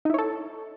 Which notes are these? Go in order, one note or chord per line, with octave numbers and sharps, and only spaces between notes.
D#4 E4 A4 C#5